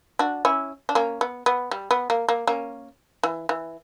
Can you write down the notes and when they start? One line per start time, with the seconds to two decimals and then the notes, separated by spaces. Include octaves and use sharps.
0.19 D4 F#4
0.45 C#4 E4
0.89 D4
0.95 A#3 C#4
1.21 B3
1.46 B3
1.71 G3
1.91 B3
2.10 A#3
2.28 A#3
2.47 A#3 C#4
3.23 E3
3.49 E3